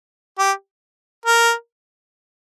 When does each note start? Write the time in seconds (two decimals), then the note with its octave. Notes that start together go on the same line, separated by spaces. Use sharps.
0.39 G4
1.26 A#4